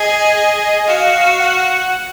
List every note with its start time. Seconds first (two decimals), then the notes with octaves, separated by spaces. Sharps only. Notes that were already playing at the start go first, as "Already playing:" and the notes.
Already playing: G#4 D#5
0.35 D#5
0.87 F#4 F5
1.39 F#5